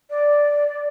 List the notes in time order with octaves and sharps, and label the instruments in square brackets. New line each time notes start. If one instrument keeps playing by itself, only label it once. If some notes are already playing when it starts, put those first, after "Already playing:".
[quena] D5